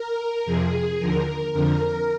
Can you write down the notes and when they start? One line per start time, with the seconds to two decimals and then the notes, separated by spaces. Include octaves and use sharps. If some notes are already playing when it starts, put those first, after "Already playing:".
Already playing: A#4
0.45 F2 C3 F3 G#4
0.99 D#2 D3 F3 A#4
1.52 F2 D3 F3 A#4